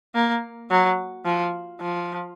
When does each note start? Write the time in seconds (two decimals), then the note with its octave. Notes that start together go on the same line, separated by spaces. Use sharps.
0.15 A#3
0.70 F#3
1.25 F3
1.81 F3